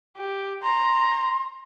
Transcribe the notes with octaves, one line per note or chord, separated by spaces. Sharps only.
G4
A#5 C6